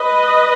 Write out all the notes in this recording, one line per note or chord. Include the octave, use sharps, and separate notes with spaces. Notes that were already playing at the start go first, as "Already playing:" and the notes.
Already playing: B4 D#5